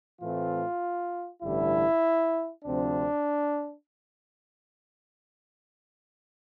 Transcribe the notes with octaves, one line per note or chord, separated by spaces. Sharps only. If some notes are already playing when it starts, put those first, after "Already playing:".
A2 E3 A3 C4 F4
A1 G2 D3 G3 E4
D2 C3 F3 C4 D4